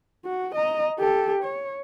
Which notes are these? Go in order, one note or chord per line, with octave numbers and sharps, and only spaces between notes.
F#4
D#5 A#5
G4 A4
C#5